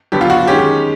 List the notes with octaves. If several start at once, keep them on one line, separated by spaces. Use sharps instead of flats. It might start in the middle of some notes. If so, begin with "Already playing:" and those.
D3 F#3 B3 D4 G4
F4
F#4
D#3 G#3 C#4 G4